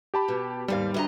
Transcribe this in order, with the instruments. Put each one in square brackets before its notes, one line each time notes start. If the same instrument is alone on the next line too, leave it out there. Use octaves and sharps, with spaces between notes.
[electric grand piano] G4 A5 B5
[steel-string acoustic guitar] B2
[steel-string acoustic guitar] D#2 G#2 F5 [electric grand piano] G3
[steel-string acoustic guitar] D2 D#5 A#5